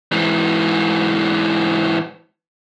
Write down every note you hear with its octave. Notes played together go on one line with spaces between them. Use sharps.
G#2 E3